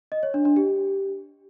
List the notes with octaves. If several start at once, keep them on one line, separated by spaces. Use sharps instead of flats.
D#5
C#5
D4
D4
G4